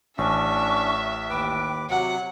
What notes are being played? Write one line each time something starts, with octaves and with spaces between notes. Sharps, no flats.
A1 C#4 D4 E5 C#6
D#2 B4 G5 D6
C3 F#3 F#4 F#5